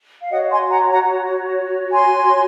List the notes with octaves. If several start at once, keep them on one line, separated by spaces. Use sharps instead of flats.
F5
F#4 C#5 D#5 F#5
G#5 C6
F#5 A#5
F#5 A#5
G#5 C6